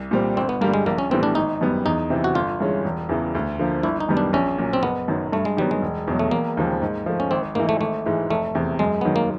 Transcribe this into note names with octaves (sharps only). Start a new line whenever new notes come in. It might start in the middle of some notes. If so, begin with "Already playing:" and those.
Already playing: C2
A#2 G3 C4
G1 C4
B3
G2 D3 G3 A#3
G#3
A#1 A#3
C#4
A2 E3 G3 B3 C4
D4
G#1 D#4
F#2 D#3 G3 B3
E2 D#4
C3 E3
F#4
G1 F4
G2 E3 G#3 C#4
E1
E2 C#3 E3
D2
D3 F3 A#3
G1 E4
D#4
F#2 D#3 G3 B3
D4
A#1 C#4
A#2 F#3
C4
F#1 B3
F#2 D#3 F#3
G2 A3
G#3
D#3 F#3 G3 B3
G#3
E1
E2 B2 F#3
A3
E1 A#3
D#2 C#3 F3 G#3
G#2
F3 A3
C#4
G#1 C4
G#2 E3 A#3
A3
G#1 A3
G#2 E3 G#3
F1 A3
E2 C3
F#2 G#3
D#3 F#3 B3
A#3